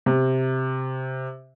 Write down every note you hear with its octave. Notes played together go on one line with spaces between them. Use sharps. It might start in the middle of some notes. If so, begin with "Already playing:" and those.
C3